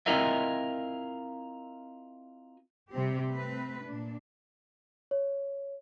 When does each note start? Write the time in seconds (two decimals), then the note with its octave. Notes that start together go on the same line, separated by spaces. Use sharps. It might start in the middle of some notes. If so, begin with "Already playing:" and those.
0.06 C4 E4 F4 A#4 D#5 E5
2.94 C3 G3 C4 G4
3.30 A3 C4 B4
3.84 A#2 D4
5.11 C#5